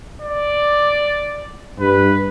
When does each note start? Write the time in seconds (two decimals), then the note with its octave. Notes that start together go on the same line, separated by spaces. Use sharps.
0.21 D5
1.80 G2 B4